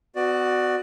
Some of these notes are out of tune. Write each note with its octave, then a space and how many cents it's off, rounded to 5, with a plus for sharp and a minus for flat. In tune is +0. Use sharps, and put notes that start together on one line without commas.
B3 +40 F#4 +0 D5 +15